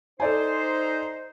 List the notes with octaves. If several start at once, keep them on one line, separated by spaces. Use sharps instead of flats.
D#4 A4 C5 D5 G#5